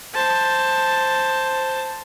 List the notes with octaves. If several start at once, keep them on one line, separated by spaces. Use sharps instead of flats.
C5 A5